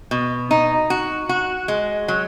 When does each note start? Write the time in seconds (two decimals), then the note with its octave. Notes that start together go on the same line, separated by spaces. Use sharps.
0.11 B2
0.51 D#4
0.90 F#4
1.29 F#4
1.68 G#3
2.08 F#3